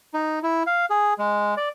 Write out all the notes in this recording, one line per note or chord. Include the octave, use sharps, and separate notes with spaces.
D#4
E4
F5
G#4
G#3
D5